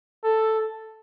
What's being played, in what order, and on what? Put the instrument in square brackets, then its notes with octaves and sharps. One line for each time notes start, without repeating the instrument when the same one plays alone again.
[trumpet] A4